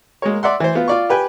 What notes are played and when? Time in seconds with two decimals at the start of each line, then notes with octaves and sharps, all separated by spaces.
0.22 G#3 A#3 A#4 C#5
0.43 D5 E5 F#5 C6
0.60 E3 C5
0.75 B3 F4
0.88 F4 D5 C#6
1.10 G4 B4 G5 G#5